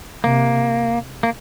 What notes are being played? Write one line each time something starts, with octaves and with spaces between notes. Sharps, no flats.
C3 A#3
A#3